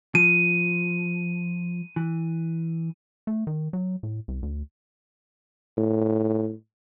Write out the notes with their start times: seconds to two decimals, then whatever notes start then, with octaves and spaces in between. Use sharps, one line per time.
0.15 F3 D#7
1.96 E3
3.27 A3
3.47 D#3
3.73 F#3
4.03 A2
4.28 C2
4.42 D2
5.78 A2